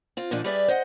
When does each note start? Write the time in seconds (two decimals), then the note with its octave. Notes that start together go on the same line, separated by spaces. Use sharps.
0.17 C4 F4
0.31 A#2 D3 F3 A#3 D4 D#4
0.44 G3 G4 G#4 B4 D5 E5
0.68 C5 D#5 F#5